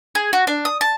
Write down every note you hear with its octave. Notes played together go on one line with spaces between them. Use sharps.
G#4
F#4
D4
D#6
A5